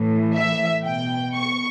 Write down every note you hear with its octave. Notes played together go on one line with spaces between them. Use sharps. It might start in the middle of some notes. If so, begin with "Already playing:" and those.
Already playing: A2 E3
E5
B2 G5
C#6